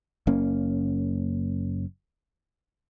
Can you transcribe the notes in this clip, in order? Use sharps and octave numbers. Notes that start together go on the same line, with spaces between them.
F#1 A#3 C#4